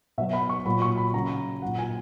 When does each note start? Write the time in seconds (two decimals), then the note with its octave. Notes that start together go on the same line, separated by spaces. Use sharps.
0.18 B2 F#3 E5
0.33 B5
0.49 C#6
0.65 A#2 F#3 B5
0.82 C#6
0.98 B5
1.13 C#3 F#3 A#5
1.62 F#3 F#5
1.66 A#2
1.79 G#5